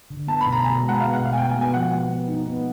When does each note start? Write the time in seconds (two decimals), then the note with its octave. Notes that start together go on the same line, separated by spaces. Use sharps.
0.10 D3
0.27 B3 A5
0.41 B5
0.46 B2
0.52 A#5
0.64 B2 G#5
0.83 G#3
0.89 F#5
1.00 B3 F5
1.13 F#5
1.19 B2
1.25 F5
1.33 G#5
1.37 B2 G5
1.49 G#5
1.55 B3
1.61 G#5
1.74 F3 F#5
1.92 B3 F#5
2.09 B3
2.28 D#4
2.46 B3